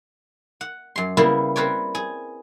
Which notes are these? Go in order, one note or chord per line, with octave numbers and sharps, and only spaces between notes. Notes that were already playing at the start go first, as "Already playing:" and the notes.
F#5
F#2 C6
C#3 G3 A#3 B3 E4 A#4
C4 A#4 B4 C#5 D5
G#4